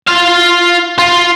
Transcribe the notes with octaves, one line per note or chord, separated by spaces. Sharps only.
F4 F5
F4